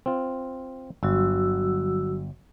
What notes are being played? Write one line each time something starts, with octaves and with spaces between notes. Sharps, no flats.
C4 F4
G1 F#3 F#4 E6